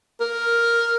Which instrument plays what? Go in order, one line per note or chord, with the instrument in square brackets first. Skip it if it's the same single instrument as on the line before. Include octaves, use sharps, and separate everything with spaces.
[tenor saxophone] A#4